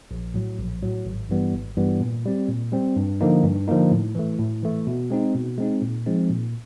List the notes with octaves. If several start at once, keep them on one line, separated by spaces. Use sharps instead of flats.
A#1
A2 F#3
A#1
A2 F#3
G#1
G2 E3 G3 B3
G#1
G2 E3 G3 B3
A#2
G3 C4
A#2
G3 C4
G2
D3 F3 A#3 D#4
G2
D3 F3 A#3 D#4
A2
E3 A3
A2
E3 A3
B2
G#3 C4 D#4
B2
G#3 C4 D#4
A#2
F3 G#3 C4 D#4
A#2